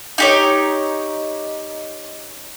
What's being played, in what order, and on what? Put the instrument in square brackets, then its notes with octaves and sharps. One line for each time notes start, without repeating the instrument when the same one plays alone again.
[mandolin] D#4 G4 C#5